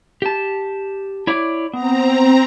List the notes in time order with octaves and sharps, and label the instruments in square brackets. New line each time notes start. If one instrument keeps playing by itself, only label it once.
[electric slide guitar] G4 A5
E4 C#5 D5
[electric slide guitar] B3 [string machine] C4 A#5